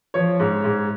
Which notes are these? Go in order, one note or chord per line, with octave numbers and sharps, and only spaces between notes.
F3 C#5
G#2
G#2